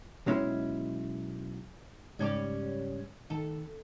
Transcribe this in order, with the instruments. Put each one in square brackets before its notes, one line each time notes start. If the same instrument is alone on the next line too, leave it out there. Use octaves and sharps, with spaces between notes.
[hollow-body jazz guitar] B1 G#3 C#4 E4
[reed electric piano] G#2 C#3 G#6 [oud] G3 C#4 D5
[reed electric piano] D#3 [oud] A4